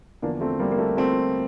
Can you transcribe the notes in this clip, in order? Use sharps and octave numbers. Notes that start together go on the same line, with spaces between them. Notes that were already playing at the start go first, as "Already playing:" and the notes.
E2 D3 F3 A#3 D4
A3 C4
G3 A#3
A#3
A3
A3 C4